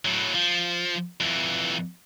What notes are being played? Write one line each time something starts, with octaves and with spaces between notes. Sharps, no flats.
A2 F#3
F3
F2 E3